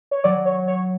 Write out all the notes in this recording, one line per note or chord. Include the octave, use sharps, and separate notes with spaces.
C#5
F#3 D5
C#5
C#5